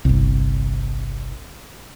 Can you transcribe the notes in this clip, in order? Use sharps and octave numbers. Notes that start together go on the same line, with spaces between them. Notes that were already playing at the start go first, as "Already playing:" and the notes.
G1 C2